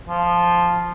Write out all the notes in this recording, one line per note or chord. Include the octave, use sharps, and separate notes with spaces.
F3